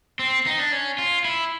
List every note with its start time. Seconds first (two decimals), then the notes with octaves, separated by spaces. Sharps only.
0.19 C4
0.46 D#4
0.59 D4
0.72 C#4
0.98 F4
1.25 E4